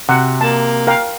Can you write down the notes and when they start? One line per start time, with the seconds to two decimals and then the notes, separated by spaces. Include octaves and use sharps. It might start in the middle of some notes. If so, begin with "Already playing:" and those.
0.09 C3 F#4 F#5
0.41 A#3 A5
0.87 A#4 F5 G5